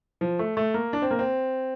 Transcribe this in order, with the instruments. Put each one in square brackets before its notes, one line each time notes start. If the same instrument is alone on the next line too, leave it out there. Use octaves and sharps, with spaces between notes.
[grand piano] F3
A3
A3
A#3
D4
C4
A#3
C4